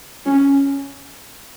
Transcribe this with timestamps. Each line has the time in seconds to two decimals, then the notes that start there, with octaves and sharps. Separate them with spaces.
0.26 C#4